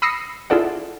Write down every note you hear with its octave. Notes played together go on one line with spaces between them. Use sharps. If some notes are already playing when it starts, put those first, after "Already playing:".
B5 D#6 E6 A#6 C7 C#7
E4 F4 G#4 A4 D5 F#5